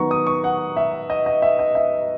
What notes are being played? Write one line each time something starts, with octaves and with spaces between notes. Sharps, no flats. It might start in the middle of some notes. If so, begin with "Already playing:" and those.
Already playing: D#3 F#3 B3 A#5 C#6
D#6
C#6
F#5
E5
D#5
D#5
E5
D#5
E5